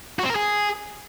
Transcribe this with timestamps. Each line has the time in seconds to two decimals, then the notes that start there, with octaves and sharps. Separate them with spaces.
0.19 F#4
0.25 C4
0.30 A#4
0.35 G#4